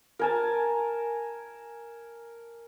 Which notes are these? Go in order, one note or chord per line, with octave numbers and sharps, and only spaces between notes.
A#4 G#5 A5